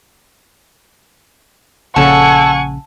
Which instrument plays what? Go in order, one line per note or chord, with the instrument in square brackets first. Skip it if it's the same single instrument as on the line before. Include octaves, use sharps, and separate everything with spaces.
[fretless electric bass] A#1 C#3 [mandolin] A4 [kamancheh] F#5 G#5 [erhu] C#6